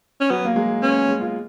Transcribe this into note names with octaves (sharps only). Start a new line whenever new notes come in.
C#4
F#3 B3
A#3
G#3
B3 C#4
G#3
F4